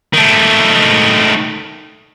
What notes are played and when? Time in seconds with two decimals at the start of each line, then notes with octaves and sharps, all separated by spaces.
0.13 D#3 A3